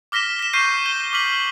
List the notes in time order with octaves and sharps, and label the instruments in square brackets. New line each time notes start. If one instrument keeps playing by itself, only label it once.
[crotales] D6 F6 A#6 B6 E7 G7
B6 E7
C#6 F6 G6 C7 D#7
G6 D#7 G7
D6 F6 B6 F#7 G7